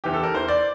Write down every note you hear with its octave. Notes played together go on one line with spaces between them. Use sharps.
E2 E3 G4
A4
A#4
E2 E3 C5
D5